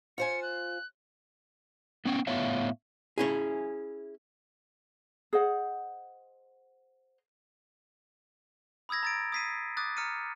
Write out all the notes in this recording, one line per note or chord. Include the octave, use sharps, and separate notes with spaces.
F4 C5 G#5 C#7
F#6
B3 C#4 G5
A2 B3 C#5 E5 F5
C#4 E4 G#4
G#4 C5 D#5 F#5
B5 D#6 E6 G#6 A#6
A#5 A6 D7
D#6 G#6 B6 C7 D#7
D6 D#6 F#6 A6
A#5 F6 C#7 D#7